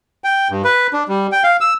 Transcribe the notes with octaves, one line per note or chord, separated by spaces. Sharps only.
G5
G2
B4
D4
G3
G5
F5
E6